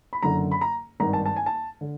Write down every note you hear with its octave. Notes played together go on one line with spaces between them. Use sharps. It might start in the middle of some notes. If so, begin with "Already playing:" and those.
B5
F#1 F#2 D3 A#5
B5
A#5
G#1 G2 D#3 A#5
A5
A5
G#5
A5
D3